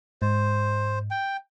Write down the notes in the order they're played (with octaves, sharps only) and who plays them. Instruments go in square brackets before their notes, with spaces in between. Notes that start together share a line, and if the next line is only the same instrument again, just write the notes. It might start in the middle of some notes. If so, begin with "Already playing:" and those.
[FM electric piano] G#2 [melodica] C5
[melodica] G5